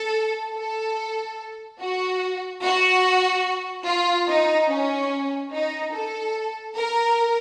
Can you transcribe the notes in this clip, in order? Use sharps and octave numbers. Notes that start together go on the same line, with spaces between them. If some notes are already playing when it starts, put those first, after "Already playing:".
Already playing: A4
A4
F#4
F#4
F4
D#4
C#4
D#4
A4
A#4